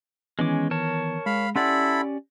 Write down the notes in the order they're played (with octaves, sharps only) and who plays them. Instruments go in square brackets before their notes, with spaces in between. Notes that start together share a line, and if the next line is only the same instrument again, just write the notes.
[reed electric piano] D#3 E3 B3 [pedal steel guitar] G#3 C#4 D6
[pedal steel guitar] A#4 C#5 A5
[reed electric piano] G#3 [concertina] F5 B5
[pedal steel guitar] C#4 G4 D5 [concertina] E4 A4 B5 [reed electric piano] F#5 C6